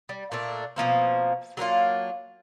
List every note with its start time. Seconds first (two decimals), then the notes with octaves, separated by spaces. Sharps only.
0.09 G3
0.32 A#2 A3 D4
0.76 B2 F3 A#3 C4
1.57 F#3 A#3 D4 F4